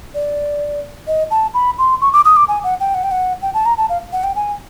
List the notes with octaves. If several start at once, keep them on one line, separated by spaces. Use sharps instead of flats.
D5
D#5
A5
B5
C6
C#6
D6
D#6
D6
G#5
F#5
G5
F#5
G5
F#5
G5
A5
A#5
A5
F5
F#5
G5
G#5